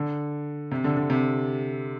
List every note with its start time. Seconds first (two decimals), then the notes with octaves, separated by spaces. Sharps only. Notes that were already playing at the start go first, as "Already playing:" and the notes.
Already playing: D3
0.71 C3
0.84 D3
0.97 D3
1.10 C3